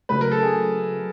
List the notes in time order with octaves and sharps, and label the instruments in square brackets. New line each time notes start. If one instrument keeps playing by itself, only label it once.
[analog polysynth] C#3 F#3 A3 [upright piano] B4
[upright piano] A#4
A4
G#4